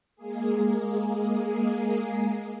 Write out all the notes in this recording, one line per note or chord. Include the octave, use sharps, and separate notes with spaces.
G#3 A#3 G#4